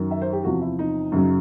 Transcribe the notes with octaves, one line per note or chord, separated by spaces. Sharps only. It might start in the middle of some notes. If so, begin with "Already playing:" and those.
Already playing: F#2 D#3 F#3
E5
C5
G4
E2 C3 F3 F#4
E4
D#4
F#2 C#3 F#3